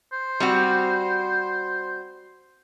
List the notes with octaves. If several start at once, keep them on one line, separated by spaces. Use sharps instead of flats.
C5
G3 C4 F#4